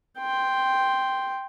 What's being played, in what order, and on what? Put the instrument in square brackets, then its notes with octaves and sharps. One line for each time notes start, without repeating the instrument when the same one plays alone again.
[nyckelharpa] G5 C6